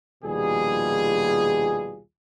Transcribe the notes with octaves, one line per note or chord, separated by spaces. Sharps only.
A#1 D#2 B2 G3 F4 G#4